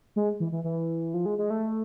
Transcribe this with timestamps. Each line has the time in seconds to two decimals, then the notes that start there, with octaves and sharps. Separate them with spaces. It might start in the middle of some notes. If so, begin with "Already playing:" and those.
0.16 G#3
0.40 E3
0.52 E3
0.64 E3
1.14 F3
1.26 G#3
1.38 G#3
1.50 A3